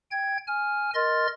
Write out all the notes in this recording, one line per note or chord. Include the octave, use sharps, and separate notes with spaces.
G5 G#6
G#5 F6
A#4 D#5 C6 F6 A6